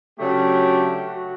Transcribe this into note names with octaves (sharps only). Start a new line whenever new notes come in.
C#3 F#3 A3 D4 G4
F#4